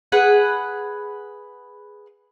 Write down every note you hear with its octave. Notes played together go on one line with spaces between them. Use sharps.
G#4 B4 F#5